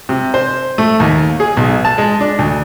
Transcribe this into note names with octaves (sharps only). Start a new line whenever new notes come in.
C3
C5
A3
D#2
G#4
B1
A5
G#3
D4
D2